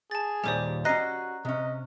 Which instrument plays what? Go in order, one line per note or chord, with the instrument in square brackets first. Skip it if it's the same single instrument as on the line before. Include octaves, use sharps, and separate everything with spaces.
[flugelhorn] G#4 [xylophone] A5 A6
[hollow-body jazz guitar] D#2 A#2 G3 [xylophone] G4 C5 D5
[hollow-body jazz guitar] C#4 D#5 [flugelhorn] F#4 [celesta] A#5 F#6 [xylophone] A#6 C7
[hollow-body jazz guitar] C3 C#4 [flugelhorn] D#5